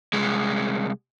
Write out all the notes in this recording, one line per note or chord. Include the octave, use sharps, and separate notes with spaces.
C2 G#3